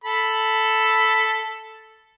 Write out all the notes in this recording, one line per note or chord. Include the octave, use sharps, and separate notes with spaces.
A4 B5